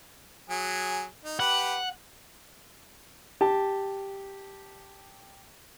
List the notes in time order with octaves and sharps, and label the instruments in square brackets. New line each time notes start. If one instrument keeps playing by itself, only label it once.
[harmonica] F#3 G#4
D#4
[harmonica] G4 B4 [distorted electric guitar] F#5
[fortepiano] G4 A5